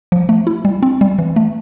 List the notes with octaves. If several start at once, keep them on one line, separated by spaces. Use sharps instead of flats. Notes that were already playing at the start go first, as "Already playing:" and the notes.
F3
A3
E4
G3
C4
G3
E3
A3